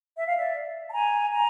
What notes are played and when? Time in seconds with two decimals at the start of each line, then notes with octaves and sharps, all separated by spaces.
0.16 E5
0.26 F5
0.36 D5 E5
0.88 A5
0.93 G#5 A#5
1.31 G#5 A#5